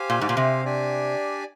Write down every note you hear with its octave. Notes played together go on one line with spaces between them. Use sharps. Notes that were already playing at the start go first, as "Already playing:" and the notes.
Already playing: G4 C5 F5 G#5
A#2
G#2
A#2
C3
D4 G4 D5 G#5